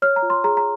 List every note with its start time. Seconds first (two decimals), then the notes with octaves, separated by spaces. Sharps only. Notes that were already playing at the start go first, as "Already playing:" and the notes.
0.02 C#5 F6
0.16 A#5
0.22 F4
0.30 C6
0.44 G#4 A#5
0.57 A#5